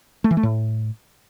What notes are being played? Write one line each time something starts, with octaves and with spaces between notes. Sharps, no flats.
A3
E3
A3
A2